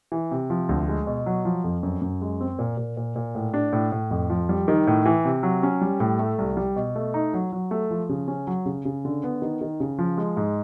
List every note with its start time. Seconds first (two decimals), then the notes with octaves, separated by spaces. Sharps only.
0.12 E3
0.31 C3
0.50 F3
0.69 D2
0.88 G#3
1.07 B2
1.26 F#3
1.45 F3
1.64 F2
1.83 F#2
2.01 F#2
2.21 G#3
2.41 C4
2.59 A#2
2.77 A#2
2.97 A#2
3.16 A#2
3.35 A2
3.54 D4
3.73 A2
3.92 A2
4.11 F2
4.30 F3
4.49 G3
4.68 D#3
4.87 A2
5.05 E3
5.25 C3
5.43 F#3
5.63 C#4
5.82 G3
6.00 A2
6.19 A3
6.38 C2
6.57 G3
6.76 B2
6.95 A3
7.14 D#4
7.34 F#3
7.52 F#3
7.71 A3
7.91 F3
8.09 C#3
8.28 C#4
8.47 F#3
8.66 C#3
8.85 C#3
9.05 D3
9.23 B3
9.42 D#3
9.61 D#3
9.80 C#3
9.98 F3
10.18 G#3
10.37 G#2